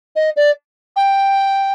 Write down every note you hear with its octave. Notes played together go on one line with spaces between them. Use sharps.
D#5
D5
G5